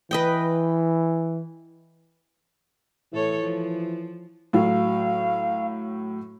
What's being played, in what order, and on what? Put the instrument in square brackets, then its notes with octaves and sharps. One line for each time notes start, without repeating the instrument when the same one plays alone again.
[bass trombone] E3 [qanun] B4 D#5 G5
[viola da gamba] A2 A4 C#5 [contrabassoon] E3
[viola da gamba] F3
[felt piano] A2 F#3 [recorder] F5